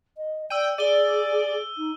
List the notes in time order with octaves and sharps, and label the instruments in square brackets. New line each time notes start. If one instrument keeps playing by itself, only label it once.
[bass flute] D#5
[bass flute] D5 [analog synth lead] G5 [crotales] E6 D#7
[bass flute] G#4 [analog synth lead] D5 [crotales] D#7 G7
[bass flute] D#4